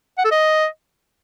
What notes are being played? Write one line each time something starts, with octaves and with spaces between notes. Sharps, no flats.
F#5
A4
D#5